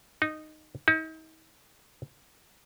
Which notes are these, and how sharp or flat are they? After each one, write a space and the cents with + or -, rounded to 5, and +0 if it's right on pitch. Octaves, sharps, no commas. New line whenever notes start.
D#4 -10
D#4 +40